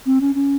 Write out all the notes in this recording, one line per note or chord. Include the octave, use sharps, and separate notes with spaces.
C4
C#4
C#4